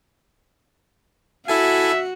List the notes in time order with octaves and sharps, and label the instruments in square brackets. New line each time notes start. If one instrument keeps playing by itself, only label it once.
[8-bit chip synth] E4 A4 G#5 [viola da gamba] F#4 [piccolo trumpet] E5